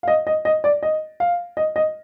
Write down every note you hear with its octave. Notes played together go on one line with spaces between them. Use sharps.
F5
D#5
D#5
D#5
D5
D#5
F5
D#5
D#5